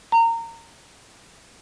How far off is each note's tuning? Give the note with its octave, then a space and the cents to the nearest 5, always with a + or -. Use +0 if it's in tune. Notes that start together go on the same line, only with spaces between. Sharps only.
A#5 -25